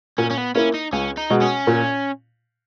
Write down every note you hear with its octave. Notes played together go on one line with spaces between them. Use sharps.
A#2 C#4
C#4
B3
A#3 C#4 E4
D#4
C#2 C#4
D#4
B2 G#3
C#4
A#2